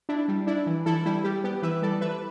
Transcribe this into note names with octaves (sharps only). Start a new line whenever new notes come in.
D4 E4
G3
D4 E4
E3
E3 E4 A4
G3 E4
G3 G4
B3 G4
E3 B4 E5
G3 A4 D5
E3 B4 E5